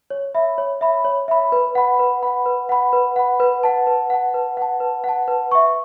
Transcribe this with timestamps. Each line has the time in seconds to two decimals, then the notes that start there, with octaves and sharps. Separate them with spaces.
0.10 C#5
0.35 E5 B5
0.58 C#5
0.81 E5 B5
1.05 C#5
1.28 E5 B5
1.52 B4
1.75 F#5 B5
1.99 B4
2.23 F#5 B5
2.46 B4
2.69 F#5 B5
2.93 B4
3.16 F#5 B5
3.40 B4
3.63 F#5 A5
3.87 B4
4.10 F#5 A5
4.34 B4
4.57 F#5 A5
4.80 B4
5.04 F#5 A5
5.28 B4
5.51 E5 C#6